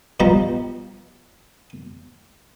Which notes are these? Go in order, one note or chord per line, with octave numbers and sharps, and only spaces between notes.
B2 F3 G3 A#5